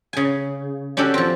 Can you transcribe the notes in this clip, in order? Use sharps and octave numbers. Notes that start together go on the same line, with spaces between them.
C#3 G#5
C#4 D4 F#4 G4 A4
F3 C4